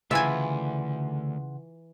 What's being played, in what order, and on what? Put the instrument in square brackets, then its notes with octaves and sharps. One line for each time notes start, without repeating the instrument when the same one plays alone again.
[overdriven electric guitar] D2 [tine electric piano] C#3 F#5 C6 [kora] E3 F4 [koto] E5 G#5